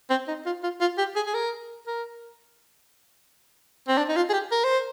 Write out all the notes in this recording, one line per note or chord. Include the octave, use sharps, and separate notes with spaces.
C4
D#4
F4
F4
F4
G4
G#4
G#4
A#4
A#4
C4
D4
D#4
F4
G#4
G4
A#4
C5